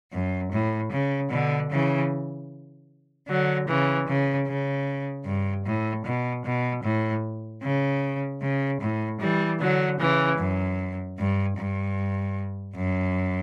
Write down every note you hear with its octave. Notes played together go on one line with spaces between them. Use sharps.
F#2
A2
C#3
B2 D3
C#3 E3
D3 F#3
C#3 E3
C#3
C#3
G2
A2
B2
B2
A2
C#3
C#3
A2
E3 G3
D3 F#3
C#3 E3
F#2
G2
G2
F#2